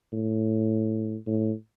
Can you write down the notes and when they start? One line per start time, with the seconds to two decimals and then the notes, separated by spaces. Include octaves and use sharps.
0.13 A2
1.27 A2